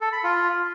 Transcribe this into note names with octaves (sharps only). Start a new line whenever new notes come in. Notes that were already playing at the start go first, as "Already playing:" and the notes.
A4
B5
F4